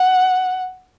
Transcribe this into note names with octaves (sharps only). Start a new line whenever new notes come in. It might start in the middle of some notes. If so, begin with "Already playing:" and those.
Already playing: F#5